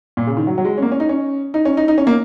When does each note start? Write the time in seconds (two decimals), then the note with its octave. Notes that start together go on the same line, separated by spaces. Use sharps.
0.17 A#2
0.27 C#3
0.37 D#3
0.47 F#3
0.58 F#3
0.65 G#3
0.78 C#4
0.82 A#3
0.92 C#4
1.00 D#4
1.09 C#4
1.54 D#4
1.65 C#4
1.77 D#4
1.88 D#4
1.98 C#4
2.07 A#3